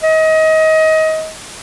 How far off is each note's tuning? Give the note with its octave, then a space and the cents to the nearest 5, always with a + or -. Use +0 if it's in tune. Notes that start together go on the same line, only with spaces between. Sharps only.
D#5 +25